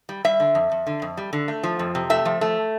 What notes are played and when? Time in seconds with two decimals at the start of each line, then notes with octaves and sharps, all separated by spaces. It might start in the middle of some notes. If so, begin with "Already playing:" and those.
0.09 G3
0.24 G3 E5
0.40 D3
0.55 F2
0.72 F2
0.86 D3
1.02 F2
1.17 G3
1.33 D3
1.48 A3
1.63 F3
1.79 F2
1.95 C3
2.10 A3 E5
2.25 F3
2.41 A3